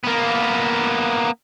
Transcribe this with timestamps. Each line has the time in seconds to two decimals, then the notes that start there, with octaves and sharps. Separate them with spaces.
0.04 A#3 B3